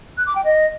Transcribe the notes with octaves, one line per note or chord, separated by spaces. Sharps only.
F#6
D6
G5
D#5